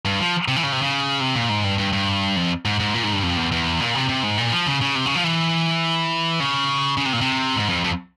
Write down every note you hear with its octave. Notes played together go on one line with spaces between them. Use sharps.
G2
F3
C3
E3
C#3
C3
C#3
C3
A#2
G#2
G2
G2
G2
F2
G#2
G#2
A#2
G#2
G2
F2
E2
E2
A#2
C3
C3
G#2
A#2
F3
C#3
C#3
C3
C#3
F3
E3
C#3
C#3
C3
A#2
C3
G#2
F2
F2